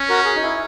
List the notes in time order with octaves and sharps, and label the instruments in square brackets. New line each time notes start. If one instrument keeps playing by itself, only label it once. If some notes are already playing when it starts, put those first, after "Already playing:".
Already playing: [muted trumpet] C#4
[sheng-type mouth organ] F#4 A#4
G#4
D#4
E4